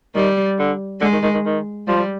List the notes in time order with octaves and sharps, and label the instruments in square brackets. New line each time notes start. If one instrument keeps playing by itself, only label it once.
[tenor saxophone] D#3 [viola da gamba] G3
[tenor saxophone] D3
[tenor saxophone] D3 [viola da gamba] G#3
[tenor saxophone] D#3
D#3
D#3
D#3
[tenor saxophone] F3 [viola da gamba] G3